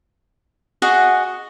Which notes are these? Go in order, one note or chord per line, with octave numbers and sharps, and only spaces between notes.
F#4 G#4 D#5 F#5